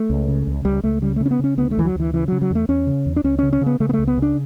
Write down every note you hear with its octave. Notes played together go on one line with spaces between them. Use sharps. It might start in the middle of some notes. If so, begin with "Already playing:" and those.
Already playing: A3
C#2
C#3
C#2
C#2 G3
C#2 A3
C#3 G3
A3
C#3
C#4
B3
C#3 C#4
D2 B3
A3
D2 E3
F#3
D2 E3
C#3 E3
C#3 F#3
F#3
E2 A3
E2 C#4
C#3
E2
D4
C#2 C#4
C#3 C#4
C#4
C#3
B3
C#3 A3
B3
A3
C#2
B3
C#3 D4